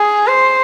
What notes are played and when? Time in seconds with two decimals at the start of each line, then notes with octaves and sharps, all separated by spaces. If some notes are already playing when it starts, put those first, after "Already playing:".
Already playing: G#4
0.27 C5